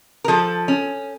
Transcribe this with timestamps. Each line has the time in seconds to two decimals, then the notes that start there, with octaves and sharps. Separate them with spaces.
0.24 A#4
0.28 F3 A4
0.68 C#4